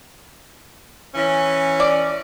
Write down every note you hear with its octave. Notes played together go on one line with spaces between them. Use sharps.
E3 C#4
D5